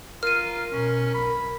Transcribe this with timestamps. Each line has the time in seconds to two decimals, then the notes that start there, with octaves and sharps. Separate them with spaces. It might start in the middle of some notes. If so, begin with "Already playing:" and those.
0.23 F4 A#4 F6 D#7
0.72 B2 C#4
1.14 B1 B5